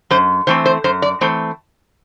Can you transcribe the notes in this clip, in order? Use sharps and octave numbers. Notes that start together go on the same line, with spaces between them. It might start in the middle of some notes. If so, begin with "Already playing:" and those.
F#2 C5
E3 A3 C4 C5
C5
F#2 C5
D5
E3 A3 C4 C5